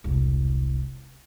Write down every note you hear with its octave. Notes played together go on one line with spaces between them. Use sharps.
E1 C2